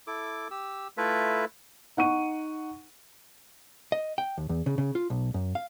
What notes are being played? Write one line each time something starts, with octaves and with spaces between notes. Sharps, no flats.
E4 A4 D6
G4 E6
A3 E4 F4 A4 B4 E5
D#4 F#5 C#6 D#7
D#5
G5
D#2
E2
C#3
C#3
F4
B1
F#2
F5